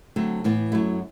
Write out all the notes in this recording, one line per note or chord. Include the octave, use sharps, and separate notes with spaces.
D3 F#3 A3 C4
A2 E3 B3
F#2 F#3 A3 E4